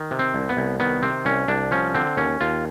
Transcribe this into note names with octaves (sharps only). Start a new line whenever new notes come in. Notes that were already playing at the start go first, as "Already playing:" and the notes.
Already playing: D#3
C3
C4
C2
B3
C2
D#3 B3
C3 C4
C2 C#4
C2 D4
F3 C#4
D3 C4
D#2 C#4
D#2 F4